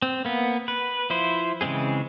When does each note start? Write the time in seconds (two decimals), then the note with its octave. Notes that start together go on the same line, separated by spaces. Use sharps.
0.02 C4
0.25 A#3 B3
0.68 B4
1.10 F3 E4 C5
1.61 C#3 E3 G#3 C4 G#4